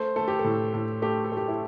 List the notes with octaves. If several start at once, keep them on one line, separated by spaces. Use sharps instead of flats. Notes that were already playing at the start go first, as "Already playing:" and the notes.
Already playing: A3 C5
A3 A4
G4
A4
A2
A2
A3 G4
A4
A3 G4
E4